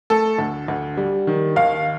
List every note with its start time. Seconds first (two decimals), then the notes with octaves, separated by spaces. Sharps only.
0.10 A3 A4
0.39 D2
0.68 D2
0.97 G3
1.27 D#3
1.56 D#2 F5